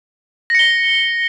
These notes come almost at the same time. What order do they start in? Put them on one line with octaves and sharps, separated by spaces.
A#6 C#7 G7